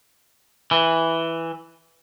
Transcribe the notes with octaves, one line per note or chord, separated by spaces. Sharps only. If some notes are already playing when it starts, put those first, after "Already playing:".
E3